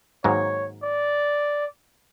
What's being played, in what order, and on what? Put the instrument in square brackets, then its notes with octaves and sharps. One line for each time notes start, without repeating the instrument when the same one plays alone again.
[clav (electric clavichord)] G#2 D#3 F#3 A#3 [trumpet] C#5
[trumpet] D5